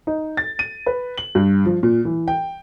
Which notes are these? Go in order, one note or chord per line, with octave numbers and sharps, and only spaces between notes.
D#4
A6
D#7
B4
F#7
G2
F3
A#2
E3
G5